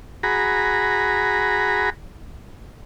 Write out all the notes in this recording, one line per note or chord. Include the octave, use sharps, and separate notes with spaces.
F#4 G#4 A#5 B5